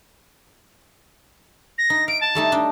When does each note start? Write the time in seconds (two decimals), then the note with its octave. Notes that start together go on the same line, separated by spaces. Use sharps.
1.78 A#6
1.90 D#4
2.08 F5 D7
2.21 A5
2.35 G3 A3 D#4
2.52 D4 D#4